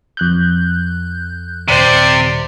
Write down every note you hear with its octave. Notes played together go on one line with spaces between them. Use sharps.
F2 F#6 G6
D#1 C3 C5 D5